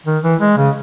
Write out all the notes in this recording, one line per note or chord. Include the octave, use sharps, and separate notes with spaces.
D#3
E3
G#3
C#3